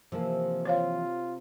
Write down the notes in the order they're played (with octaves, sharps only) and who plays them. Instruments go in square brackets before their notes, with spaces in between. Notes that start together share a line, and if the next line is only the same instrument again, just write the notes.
[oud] C3 [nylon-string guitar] E3 F3 A#3
[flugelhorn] F4 [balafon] C5 C#5 F5